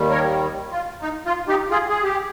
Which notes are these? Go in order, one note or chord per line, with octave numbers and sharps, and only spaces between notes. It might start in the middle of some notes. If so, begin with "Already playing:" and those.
Already playing: D#2 D#3 G3
A#4 C#5
F4
D#4
F4
D#4 G4
F4 G#4
G#4
G4